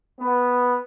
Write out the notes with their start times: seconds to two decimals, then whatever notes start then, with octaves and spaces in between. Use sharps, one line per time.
0.20 B3